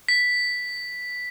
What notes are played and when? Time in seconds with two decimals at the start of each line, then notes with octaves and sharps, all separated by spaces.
0.09 B6